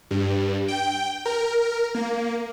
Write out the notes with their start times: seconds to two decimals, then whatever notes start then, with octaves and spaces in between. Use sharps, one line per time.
0.11 G2
0.68 G5
1.26 A#4
1.95 A#3